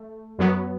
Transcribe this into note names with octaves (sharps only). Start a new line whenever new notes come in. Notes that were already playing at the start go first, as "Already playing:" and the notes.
Already playing: A3
F#2 F#3 B3